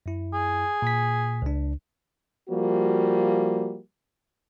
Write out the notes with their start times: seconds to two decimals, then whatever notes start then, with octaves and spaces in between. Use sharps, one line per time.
0.06 F#2 E4
0.33 G#4
0.82 A#2 B6
1.42 C#2 D4
2.49 F3 G3 A#3 F#4